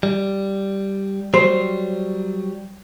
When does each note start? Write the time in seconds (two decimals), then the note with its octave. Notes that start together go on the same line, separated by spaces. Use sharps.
0.03 G3
1.34 F#3 G3 C5